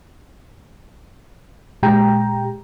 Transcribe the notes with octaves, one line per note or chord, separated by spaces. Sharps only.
A#2 G#3 G4 G5 A#5